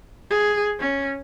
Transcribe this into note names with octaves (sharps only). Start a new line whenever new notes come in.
G#4
C#4